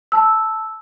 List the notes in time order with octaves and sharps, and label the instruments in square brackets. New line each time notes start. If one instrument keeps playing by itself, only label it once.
[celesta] A5 E6